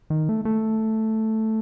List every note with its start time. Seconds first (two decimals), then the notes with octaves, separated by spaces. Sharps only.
0.10 D#3
0.29 A3
0.45 A3